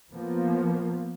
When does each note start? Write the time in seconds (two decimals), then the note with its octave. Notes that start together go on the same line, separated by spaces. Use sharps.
0.12 F3 A#3 B3